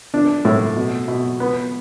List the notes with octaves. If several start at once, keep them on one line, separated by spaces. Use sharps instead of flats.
D4
A2
B2
B2
B3